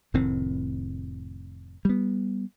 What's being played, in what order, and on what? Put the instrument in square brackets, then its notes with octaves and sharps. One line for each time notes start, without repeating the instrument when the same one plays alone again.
[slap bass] F1 A2 D#3 C4
G3 B3